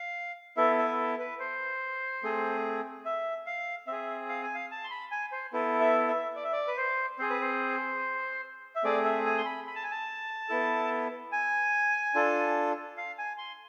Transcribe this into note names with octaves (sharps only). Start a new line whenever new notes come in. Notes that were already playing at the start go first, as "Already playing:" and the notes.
Already playing: F5
B3 E4 A4 E5
E5
B4
C5
A3 C4 G#4
E5
F5
C4 G#4 E5
F5
G#5
F5
A5
C6
B5
G#5
C5
B3 E4 A4
E5
E5
D5
E5
D5
B4
C5
C4 G#4 C5
B4
C5
E5
A3 C4 G#4 D5
E5
G#5
C6
B5
B5
A5
G#5
A5
B3 E4 A4
G#5
D4 F4 A4
F5
G#5
C6